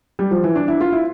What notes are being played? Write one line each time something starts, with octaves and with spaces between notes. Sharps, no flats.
G3
F3
E3
D4
E4
F4
E4